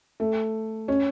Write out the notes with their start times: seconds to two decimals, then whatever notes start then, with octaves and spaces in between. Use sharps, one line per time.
0.20 A3
0.88 C#4